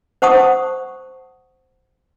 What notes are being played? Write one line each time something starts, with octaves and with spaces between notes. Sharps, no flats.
C5 F#5 A5 C#6 D#6